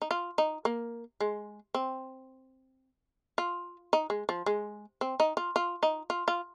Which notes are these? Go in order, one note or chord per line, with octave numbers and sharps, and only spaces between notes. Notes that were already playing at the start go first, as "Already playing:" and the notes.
D#4
F4
D#4
A#3
G#3
C4
F4
D#4
G#3
F3
G#3
C4
D#4
F4
F4
D#4
F4
F4